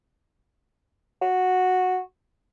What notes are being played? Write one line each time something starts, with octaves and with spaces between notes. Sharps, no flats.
F#4